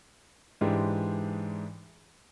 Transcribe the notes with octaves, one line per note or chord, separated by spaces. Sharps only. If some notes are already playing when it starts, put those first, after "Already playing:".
G#2 E3 G#3 D4 G4